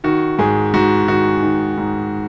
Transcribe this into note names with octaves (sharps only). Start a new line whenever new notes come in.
D#3 F#4
G#2 G#4
G#2 F#4
D#3 F#4
D#3
G#2